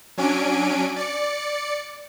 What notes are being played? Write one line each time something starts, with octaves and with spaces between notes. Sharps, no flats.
F#3 C#4 D4 G#5 D7
D5 C#7